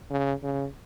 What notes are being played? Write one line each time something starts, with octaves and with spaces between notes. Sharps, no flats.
C#3
C#3